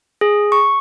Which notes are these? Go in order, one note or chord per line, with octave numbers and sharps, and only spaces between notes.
G#4
C#6